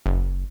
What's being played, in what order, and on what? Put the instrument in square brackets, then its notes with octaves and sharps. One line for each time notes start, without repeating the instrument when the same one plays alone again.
[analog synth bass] F#1